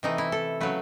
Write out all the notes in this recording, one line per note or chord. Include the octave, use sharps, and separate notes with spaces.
C3 E3 A3 D#4
E4
A4
C#3 F#3 A3 B4